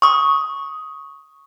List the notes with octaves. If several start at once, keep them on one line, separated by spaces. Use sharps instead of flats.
C#6 D#6